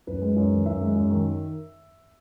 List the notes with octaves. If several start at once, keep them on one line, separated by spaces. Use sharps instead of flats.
F#2 B4
G#3
F#2
D#3
F#2 E5
G#3
F#2
D#3